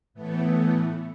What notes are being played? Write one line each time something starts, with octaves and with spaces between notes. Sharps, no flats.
A2 E3 A3 B3